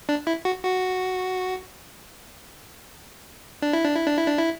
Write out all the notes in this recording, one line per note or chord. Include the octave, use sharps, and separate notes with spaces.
D4
E4
F#4
F#4
D4
E4
D4
E4
D4
E4
D4
E4